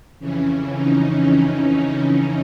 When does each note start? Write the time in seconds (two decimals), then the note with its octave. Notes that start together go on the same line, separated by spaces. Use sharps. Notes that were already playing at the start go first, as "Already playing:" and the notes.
0.20 F2 C#3 E3 C#4
0.73 D#4